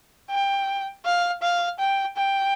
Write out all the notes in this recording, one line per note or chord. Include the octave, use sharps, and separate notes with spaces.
G5
F5
F5
G5
G5